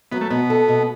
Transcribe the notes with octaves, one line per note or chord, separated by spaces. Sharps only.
F#3 B3
A3
B2 B3
A4
B2